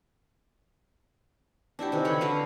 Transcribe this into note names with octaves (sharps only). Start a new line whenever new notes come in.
D4 E4 F#4 G4
C3 D#3 E3
D3 C#5 B5
D4 F#4 B4 F5